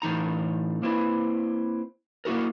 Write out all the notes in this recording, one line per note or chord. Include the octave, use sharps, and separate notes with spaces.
A2 E3 D#4 A#5
A#3 C4 E4 B4
A#3 E4 F#4 A#4